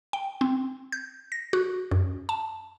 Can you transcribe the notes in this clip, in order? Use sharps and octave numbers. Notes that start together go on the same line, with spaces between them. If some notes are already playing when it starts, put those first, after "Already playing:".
G5
C4
G6
A#6
F#4
F#2
A5